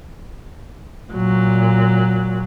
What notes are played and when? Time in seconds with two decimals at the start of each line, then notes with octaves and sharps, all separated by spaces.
1.14 A#2 F#3